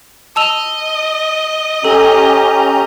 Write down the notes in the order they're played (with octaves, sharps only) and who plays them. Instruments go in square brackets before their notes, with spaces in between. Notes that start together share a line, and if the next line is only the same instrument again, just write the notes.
[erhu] D#5 [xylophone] A5 E6 F7
[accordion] C#4 G4 A#5 [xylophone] A4